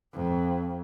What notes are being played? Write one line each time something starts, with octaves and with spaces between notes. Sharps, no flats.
F2